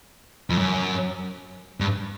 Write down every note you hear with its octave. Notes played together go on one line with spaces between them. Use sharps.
F2
F#2
G2